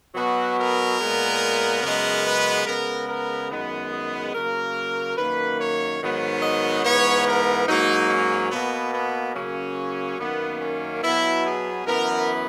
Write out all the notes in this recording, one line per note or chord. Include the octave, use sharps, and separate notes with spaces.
B2 F#3 B3 F#4
A#4
A#2 G#3 B3
F#2 C#3 G#3 B3 A#4
B4
C#3 G#3 B3 A#4
A#4
F#2 D#3 G#3 B3
G#4
C#3 F#3 A#3 A#4
F#2 D#3 A#3 B4
C#5
G#2 D#3 F#3 B3
D#5
G#2 E3 B3 C#5
A#4
G#2 F#3 A#3 D#4
C#4
B2 A#3 B3
B3
C#3 F#3 A#3 C#4
F#2 D#3 A#3 B3
C#4
B2 F#3 B3 E4
G#4
F#2 E3 B3 A#4